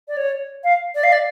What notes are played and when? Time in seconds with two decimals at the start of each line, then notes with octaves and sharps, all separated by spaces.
0.08 D5
0.17 C#5
0.64 F5
0.95 D5
1.04 F5
1.12 D5